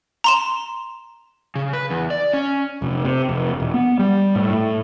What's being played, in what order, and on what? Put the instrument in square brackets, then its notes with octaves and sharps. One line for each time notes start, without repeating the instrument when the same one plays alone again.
[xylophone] A#5 C6 E7
[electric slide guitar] C#3
B4
E2
D5
C#4
[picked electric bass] F1
C3
F1
E1
B3
G3
A2
A2